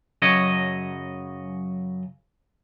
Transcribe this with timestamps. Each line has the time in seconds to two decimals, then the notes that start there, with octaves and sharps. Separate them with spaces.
0.22 F#2 C#3 F#3 C#5 D#5